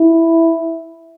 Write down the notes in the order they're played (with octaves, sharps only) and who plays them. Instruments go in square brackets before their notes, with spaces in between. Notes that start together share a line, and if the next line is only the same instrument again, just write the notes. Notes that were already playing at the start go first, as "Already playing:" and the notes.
Already playing: [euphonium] E4